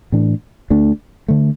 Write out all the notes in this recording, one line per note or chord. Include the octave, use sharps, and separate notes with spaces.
A2 E3 D4
D2 D3 A3 D4
D3 A3